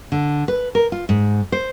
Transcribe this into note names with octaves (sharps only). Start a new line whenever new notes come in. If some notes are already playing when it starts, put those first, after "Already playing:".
D3
B4
A#4
F4
G#2
C5